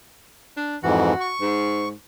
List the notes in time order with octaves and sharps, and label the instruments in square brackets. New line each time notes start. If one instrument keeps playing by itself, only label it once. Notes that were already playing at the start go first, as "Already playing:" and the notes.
[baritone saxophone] D4
[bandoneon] F2 G#2 E3 [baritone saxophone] F#4
[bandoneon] C#6
[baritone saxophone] G#2